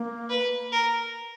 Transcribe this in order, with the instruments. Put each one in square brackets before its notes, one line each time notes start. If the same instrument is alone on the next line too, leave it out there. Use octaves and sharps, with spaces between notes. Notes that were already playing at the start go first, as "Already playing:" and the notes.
Already playing: [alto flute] A#3
[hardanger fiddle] B4
A#4